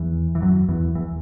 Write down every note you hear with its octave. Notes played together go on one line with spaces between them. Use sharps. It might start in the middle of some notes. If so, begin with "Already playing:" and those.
Already playing: E2 E3
E3
F#2 F#3
E2 E3
E2 E3